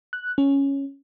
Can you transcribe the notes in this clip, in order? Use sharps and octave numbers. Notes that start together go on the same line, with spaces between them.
F#6
C#4